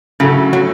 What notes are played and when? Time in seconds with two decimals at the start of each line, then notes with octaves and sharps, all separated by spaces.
0.20 A2 C#3 F#3 A3 F#4 A4
0.53 F#3